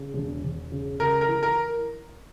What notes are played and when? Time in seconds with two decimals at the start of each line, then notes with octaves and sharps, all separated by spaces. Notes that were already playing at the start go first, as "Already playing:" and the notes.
Already playing: C#3
0.14 E1
0.43 E1
0.72 C#3
0.99 C#2 A#4
1.21 A#4
1.28 E3
1.43 A#4